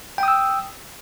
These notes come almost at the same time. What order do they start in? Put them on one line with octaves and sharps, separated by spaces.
G5 D#6 E6